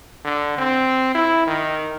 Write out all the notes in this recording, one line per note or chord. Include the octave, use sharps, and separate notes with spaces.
D3
C4
E4
D#3